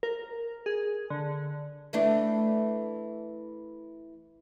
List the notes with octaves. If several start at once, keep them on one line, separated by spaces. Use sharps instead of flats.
A#4
G#4
D3
E3 A3 D4